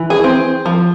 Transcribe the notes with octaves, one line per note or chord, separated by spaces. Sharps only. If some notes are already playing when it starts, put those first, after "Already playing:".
Already playing: E3
G#4
C4
F3